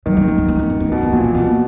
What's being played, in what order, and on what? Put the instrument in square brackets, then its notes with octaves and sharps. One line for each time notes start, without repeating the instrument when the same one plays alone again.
[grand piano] D#3 [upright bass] F#3
[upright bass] G#3
A#3
B3
B3
B3
B3
B3
[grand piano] B2 [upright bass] B3
[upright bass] A#3
[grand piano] A#2 [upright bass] C#4
[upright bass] B3
[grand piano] B2 [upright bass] A#3